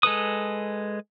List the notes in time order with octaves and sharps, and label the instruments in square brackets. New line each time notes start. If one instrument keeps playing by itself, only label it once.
[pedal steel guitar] G#3 A4 B4 D#6